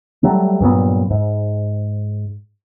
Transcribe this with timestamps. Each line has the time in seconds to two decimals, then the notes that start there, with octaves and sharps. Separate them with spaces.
0.23 F#3 G3 A3
0.61 G2 A#2 F#3 B3
1.10 G#2